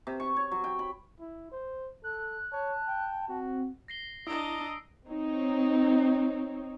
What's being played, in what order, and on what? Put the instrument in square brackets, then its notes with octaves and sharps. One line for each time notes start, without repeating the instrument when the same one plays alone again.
[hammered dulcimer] C3
C#6
C#5
F#3
G5
B5
[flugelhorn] E4
C5
[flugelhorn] A4 [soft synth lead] F#6
[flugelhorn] C#5 [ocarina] A5
[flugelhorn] G5
[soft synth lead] C4 [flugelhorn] F#4
[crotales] A#6 C7 G7
[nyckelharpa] D4 A5 [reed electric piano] E4 [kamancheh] D#5 A#5 [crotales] D#6 E6 D7
[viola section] C4 D#4 C#5